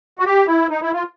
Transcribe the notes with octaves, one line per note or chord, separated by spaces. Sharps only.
F#4
G4
E4
D#4
E4
F4